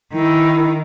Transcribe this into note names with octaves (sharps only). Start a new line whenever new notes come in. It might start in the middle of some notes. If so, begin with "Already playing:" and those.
D#3 E4